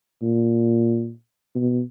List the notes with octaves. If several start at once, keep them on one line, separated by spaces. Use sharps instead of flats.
A#2
B2